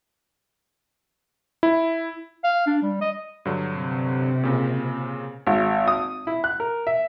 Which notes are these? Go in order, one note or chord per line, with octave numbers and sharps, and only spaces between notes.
E4
F5
D4
G3
D#5
G2 D3 F#3
C3
A#2 C#3
G#1
D#6
E4
F#6
A#4
E5